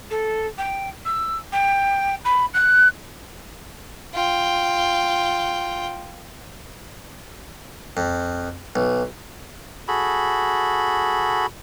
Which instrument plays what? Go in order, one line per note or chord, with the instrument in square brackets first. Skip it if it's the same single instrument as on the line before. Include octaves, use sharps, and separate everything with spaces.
[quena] A4
G5
E6
G5
B5
F#6
[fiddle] F4 G5
[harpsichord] F2
B1
[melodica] F#4 G#4 A4 B5